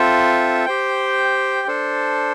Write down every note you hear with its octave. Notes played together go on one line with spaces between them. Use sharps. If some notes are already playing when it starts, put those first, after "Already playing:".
Already playing: C4 F4 A4 E5
G4 C5 G5
D4 A4 C5